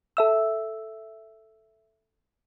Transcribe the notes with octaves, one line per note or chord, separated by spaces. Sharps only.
A4 E5 E6